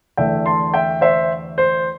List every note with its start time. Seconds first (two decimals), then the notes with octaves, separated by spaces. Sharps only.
0.17 E2 D3 A3 E5 G5
0.46 A5 C6
0.74 E5 G5
1.01 C5 E5
1.58 C5